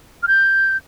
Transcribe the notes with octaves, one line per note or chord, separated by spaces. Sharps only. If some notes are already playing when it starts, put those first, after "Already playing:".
F6
G6